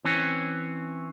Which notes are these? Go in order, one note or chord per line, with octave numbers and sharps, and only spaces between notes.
E3 C4 C#4